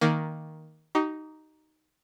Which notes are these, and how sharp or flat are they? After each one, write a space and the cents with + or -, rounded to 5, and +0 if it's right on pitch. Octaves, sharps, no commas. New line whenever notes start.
D#3 +10 A#3 +0
D#4 +0 G4 -45